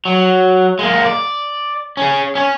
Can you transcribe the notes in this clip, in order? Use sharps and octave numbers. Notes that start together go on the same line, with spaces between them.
F#3
G#3 A#3
D5
C#4 G#4
C#4 C#5